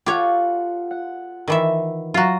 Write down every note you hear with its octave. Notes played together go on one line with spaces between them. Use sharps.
F4 G4 A4 C#5 F#5
F#5
D#3 E3 E5
F#3 F4 F#4 A#5